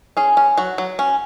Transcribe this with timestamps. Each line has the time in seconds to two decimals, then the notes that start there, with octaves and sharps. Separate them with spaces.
0.17 C#4 G#4
0.37 C#4
0.58 F#3 F#4
0.78 F#3
0.99 C#4